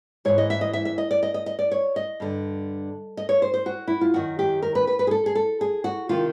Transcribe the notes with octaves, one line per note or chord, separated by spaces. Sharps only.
G#2 E3 C#5
D#5
E5
D#5
E5
E5
D#5
D5
D#5
D#5
D#5
D5
C#5
D#5
G2 D3
D#5
C#5
C5
C5
F#4
E4
F4
F#2 D#3 F#4
G4
A#4
B4
B4
B4
G#4
A4
G#4
A4
G#4
F#4
C3 D#3 F4